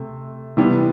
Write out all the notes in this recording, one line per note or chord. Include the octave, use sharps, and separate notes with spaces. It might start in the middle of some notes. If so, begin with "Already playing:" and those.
Already playing: C3 A3
C3 E3 G3 B3